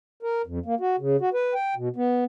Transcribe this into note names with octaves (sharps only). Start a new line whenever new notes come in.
A#4
F2
A#3
F#4
C#3
F#4
B4
G5
B2
B3